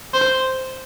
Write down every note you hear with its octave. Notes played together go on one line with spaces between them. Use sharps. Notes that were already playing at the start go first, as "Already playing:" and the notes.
C5